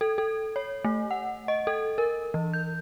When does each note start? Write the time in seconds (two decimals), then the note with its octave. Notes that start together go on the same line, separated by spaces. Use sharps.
0.01 A4
0.18 A4
0.56 C#5
0.85 A3
1.11 F#5
1.48 D#5
1.67 A4
1.98 A#4
2.34 E3
2.53 G6